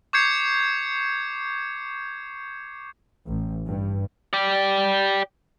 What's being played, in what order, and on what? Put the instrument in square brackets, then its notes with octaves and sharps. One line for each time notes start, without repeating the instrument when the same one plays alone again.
[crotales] C#6 D6 G6 G#6 C7 C#7
[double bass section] A1
G2
[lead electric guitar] G4 D5